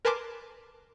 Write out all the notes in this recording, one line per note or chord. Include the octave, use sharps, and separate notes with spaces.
A#4 B4 G#5 A5 C6 D6